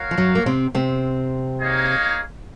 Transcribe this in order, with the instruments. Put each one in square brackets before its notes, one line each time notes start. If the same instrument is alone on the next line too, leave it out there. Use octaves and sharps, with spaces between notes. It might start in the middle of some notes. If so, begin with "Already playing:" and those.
Already playing: [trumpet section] F#4 A#4 C#5 F5
[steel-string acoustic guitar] F3
F#2 F#3
A#3
C3 C4
C3 C4
[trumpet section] A#3 D#4 G#4 C#5 F5